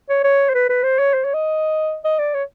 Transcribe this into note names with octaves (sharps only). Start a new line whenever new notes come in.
C#5
C#5
C5
B4
B4
C5
C#5
C5
C#5
D#5
D#5
D5
C#5